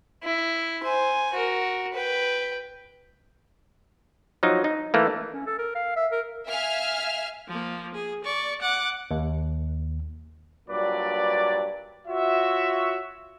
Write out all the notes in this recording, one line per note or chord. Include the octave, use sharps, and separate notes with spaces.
E4
C5 G#5
F#4 A#4
B4 G5
F3 F#3 D#4
D#4
E3 A3 A#3
C#4
A4
A#4
F5
E5
A#4
E5 F5 G#5 F6
F3 A#3
G#4
D5 C#6
F#5 D6
D#2
G2 A#2 F#3 B4 D5
F4 F#4 C#5 E5